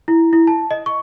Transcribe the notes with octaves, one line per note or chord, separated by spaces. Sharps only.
E4
E4
A5
D#5
C#6